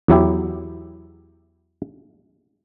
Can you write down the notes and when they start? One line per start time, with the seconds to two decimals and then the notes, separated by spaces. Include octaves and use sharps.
0.08 E2 F#3 E4 G4